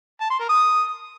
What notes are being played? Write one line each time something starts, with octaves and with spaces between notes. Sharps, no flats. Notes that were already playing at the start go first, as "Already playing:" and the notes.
A5
C6
A#4
D#6